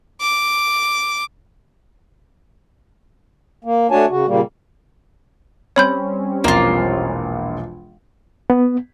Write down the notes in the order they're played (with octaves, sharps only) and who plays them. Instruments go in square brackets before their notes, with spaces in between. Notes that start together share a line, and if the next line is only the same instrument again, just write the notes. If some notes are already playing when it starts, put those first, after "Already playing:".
[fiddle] D6
[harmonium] A#3
A3 D4 F#4 C#5 G#5 A5
C#3 F#4
A#2 C#3 G3 A#3
[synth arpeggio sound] G3 C4 C#4 [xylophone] C#5 B5 G6
[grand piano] E1 A#1 A#2 [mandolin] A#3 F4
[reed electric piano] B3